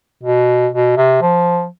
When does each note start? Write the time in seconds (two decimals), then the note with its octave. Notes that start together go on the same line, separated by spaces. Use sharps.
0.23 B2
0.73 B2
0.97 C3
1.22 F3